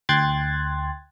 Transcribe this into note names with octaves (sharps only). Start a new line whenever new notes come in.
D2 G5 C6 F#6 G#6 A6